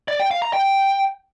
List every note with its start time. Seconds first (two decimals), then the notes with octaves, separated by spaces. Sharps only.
0.08 D5
0.20 G5
0.31 F5
0.42 A#5
0.53 G5